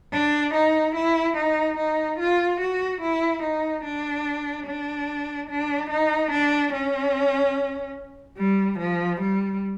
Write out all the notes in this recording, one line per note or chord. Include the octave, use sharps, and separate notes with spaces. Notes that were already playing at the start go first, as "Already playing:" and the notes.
D4
D#4
E4
D#4
D#4
F4
F#4
E4
D#4
D4
D4
D4
D#4
D4
C#4
G3
F3
G3